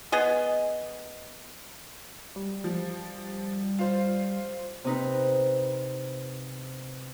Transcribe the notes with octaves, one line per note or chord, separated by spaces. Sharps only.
B3 G#4 D#5
G3
F3
F4 C5
C3 C4 D#4 B4